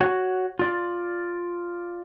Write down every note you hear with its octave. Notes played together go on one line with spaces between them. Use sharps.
F#4 C#5 F#5
F4 D5